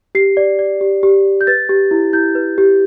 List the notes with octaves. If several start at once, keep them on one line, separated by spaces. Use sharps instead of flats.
G4 C7
D5
D5
G4
G4
D5
G6
B4 A6
G4
E4
E4 G6
B4
G4